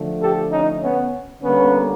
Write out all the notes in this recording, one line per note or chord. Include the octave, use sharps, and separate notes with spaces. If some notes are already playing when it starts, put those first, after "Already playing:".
Already playing: D3 F3 A3
G4 A4
C#4 D#4
B3 C#4
D3 G3 A#3 B3 C#4